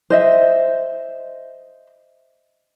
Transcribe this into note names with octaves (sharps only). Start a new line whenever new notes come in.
C5 D#5 E5